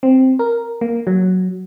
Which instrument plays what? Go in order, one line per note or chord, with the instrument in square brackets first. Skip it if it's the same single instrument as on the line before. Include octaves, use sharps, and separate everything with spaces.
[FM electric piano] C4
A#4
A#3
F#3